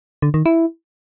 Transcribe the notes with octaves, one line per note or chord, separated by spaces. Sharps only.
D3
D#3
E4